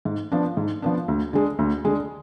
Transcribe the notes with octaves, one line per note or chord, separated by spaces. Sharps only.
G#2
F3 B3 D4
G#2
F3 B3 D4
D2
D3 G#3
D2
D3 G#3